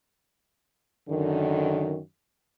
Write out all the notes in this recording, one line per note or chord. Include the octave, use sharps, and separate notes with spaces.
F#2 D3 D#3